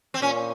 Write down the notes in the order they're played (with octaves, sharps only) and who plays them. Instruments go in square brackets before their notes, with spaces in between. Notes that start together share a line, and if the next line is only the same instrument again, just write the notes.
[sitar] C4
[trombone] A#2 [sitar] C#4